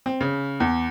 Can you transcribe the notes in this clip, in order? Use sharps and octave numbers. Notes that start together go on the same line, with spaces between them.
C4
C#3
E2